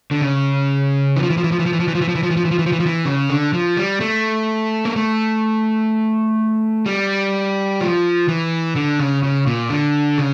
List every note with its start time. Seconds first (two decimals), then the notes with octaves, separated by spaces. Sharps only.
0.11 D3
0.21 C#3
1.17 E3
1.23 F3
1.30 E3
1.37 F3
1.44 E3
1.52 F3
1.59 E3
1.66 F3
1.73 E3
1.80 F3
1.88 E3
1.95 F3
2.01 E3
2.09 F3
2.15 E3
2.23 F3
2.31 E3
2.37 F3
2.45 E3
2.51 F3
2.59 E3
2.66 F3
2.72 E3
2.80 F3
2.86 E3
3.05 C#3
3.30 D3
3.53 F3
3.77 G3
4.01 A3
4.85 A#3
4.96 A3
6.86 G3
7.81 F3
8.28 E3
8.76 D3
9.00 C#3
9.23 C#3
9.46 A#2
9.70 D3
10.18 C#3